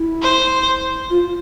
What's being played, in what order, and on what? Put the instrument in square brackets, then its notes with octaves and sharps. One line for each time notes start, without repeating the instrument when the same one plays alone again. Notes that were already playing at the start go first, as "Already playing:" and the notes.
Already playing: [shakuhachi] E4
[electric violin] C5
[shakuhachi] F4